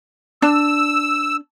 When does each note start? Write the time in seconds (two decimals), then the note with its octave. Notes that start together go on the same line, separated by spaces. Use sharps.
0.42 D4 E6